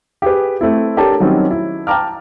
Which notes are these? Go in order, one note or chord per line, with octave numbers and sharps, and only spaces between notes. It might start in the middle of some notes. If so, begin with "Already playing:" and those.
G4 G#4 B4
A3 C4 E4
D4 G4 A4 A#4 C#5 A5
D#3 F#3 G3 C4 C#4
E4
G5 A5 A#5 D6 F6